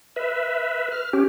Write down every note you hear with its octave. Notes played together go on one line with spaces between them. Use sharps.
B4 E5
F6
C#4 G4